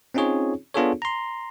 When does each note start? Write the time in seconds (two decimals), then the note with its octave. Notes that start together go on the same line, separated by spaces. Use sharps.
0.14 C4 C#4 D#4 F4 G#4 C#5
0.74 B3 D4 F4 G#4 A4 C#5
1.02 A#5 C6